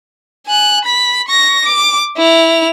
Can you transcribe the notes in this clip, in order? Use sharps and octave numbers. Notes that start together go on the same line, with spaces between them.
G#5 F#6
B5 B6
C#6 A#6
D6
E4 F7